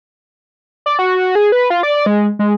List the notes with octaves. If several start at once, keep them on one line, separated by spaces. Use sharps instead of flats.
D5
F#4
G#4
B4
F4
D5
G#3
G#3